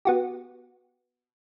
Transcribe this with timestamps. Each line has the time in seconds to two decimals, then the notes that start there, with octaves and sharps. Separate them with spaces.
0.05 B3 F#4 G4